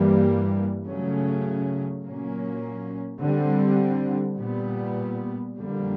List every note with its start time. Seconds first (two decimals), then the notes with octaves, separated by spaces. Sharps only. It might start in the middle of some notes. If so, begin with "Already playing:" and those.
Already playing: G2 E3 G3 A#3
0.86 C#3 F#3 A3 C#4
2.03 A#2 F#3 A#3 C#4
3.21 D3 G3 C4
4.38 A#2 G3 B3
5.55 F2 D3 G3 A#3